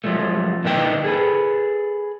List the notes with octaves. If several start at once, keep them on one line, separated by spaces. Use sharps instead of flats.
F3 F#3 G#3 A3
A#2 D3 D#4 B4 D#5 G5
G#4 A4 B4